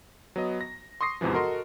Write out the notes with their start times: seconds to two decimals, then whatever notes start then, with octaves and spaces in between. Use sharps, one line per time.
0.36 F#3 B3 D#5
0.61 A#6
1.01 C6 C#6 D#6 A#6 C7
1.21 E2 G#2 C3 E3 F3
1.33 F#4 A4 A#4 D#5 C6